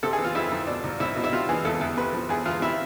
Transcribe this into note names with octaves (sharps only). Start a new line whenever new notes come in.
C3 A4
G#4
E3
F4
F2 E4
F2
B2 D4
C2
C2 E4
B2
E4
C3 F4
E3 G#4
E2 A4
E2
C3 B4
F3
E2 G#4
E2 F4
C3 E4